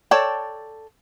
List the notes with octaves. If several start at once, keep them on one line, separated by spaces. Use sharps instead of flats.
A4 C#5 D5 G5 A5